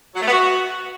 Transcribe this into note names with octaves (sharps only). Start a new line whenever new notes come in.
F#3
A3
B3
F#4